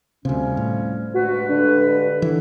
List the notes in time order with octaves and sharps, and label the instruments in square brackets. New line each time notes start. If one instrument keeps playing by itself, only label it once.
[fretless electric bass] D2 C3 [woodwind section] F3 G3 C#4
[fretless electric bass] A2
[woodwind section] G2 G#3 B4 [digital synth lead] F#4
[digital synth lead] D3
[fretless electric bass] E3